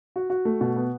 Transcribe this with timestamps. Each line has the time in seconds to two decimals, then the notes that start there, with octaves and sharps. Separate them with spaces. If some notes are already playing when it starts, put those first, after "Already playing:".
0.16 F#4
0.30 F#4
0.45 A3
0.61 B2
0.76 B3